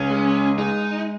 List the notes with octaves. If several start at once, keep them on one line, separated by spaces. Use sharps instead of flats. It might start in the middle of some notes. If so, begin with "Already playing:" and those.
Already playing: C#2 C#4
G#3
G#3 D#4